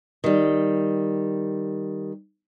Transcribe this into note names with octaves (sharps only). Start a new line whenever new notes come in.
D#3 G3